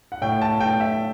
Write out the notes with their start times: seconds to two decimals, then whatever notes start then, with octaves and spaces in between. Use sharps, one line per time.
0.12 F#5
0.22 A2 G5
0.42 A5
0.60 A2 G5
0.80 E5